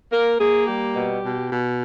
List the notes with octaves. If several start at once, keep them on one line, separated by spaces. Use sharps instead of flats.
A#3 A#4
A#3 G#4
G3 G4
B2
B2
B2